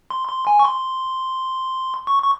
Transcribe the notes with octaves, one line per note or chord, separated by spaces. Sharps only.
C6
C6
G#5
C#6
C6
C#6
C#6